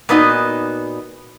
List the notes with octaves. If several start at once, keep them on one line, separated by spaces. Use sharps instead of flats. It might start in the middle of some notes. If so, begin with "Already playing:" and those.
A#2 B3 D#4 F#4